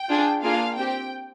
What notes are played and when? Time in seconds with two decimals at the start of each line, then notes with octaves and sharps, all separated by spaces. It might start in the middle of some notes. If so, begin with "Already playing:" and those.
Already playing: G5
0.09 D4 F4 G#4
0.43 A#3 D4 F4 G#4 F5
0.76 C4 G4 G5